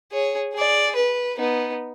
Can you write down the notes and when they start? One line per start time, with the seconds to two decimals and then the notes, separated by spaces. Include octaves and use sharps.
0.12 G#4 C#5
0.54 G#4 D5
0.95 B4
1.36 B3 D#4